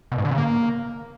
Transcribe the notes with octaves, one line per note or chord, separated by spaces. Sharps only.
B2
G#2
D3
C#3
A#3